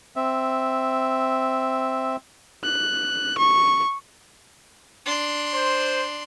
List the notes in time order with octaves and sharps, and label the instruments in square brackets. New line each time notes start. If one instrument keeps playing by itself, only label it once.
[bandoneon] C4 E5
[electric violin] F#6
C#6
[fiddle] D4 C6
[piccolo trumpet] C5